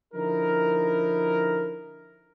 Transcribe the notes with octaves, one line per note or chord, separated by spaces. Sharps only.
D3 F3 D#4 E4 A#4